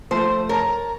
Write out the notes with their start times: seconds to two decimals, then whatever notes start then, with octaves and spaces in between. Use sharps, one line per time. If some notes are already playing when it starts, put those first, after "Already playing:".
0.11 F3 A3 C5
0.49 A#4 C#5 A5 A#5